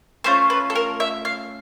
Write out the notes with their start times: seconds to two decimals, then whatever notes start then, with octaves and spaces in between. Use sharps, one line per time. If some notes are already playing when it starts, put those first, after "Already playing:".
0.24 A3 C#4 F4 C5
0.50 B4
0.70 A4
0.75 A#4
1.00 E5
1.25 F5